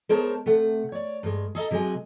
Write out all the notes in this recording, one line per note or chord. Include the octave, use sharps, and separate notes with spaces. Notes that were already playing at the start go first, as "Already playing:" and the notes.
G#3 B3 A#4 C5 C#5 A5
C3 A3 F#5
C#5 D5
G2 G#3
G#4 A4 D#5 A#5
C3 F#3 G#3 D#5 G#5